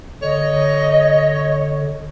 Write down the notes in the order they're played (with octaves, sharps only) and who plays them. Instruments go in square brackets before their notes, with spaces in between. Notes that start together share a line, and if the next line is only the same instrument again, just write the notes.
[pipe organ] D3 [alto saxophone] C#5 [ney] D#5